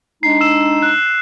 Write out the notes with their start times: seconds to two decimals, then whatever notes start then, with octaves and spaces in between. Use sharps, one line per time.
0.23 G#3 D4 D#4 C7
0.41 E6 E7
0.82 F#6